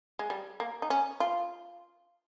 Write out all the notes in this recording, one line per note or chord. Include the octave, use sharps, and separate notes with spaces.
G#3
G3
A#3
D#4
C#4
F4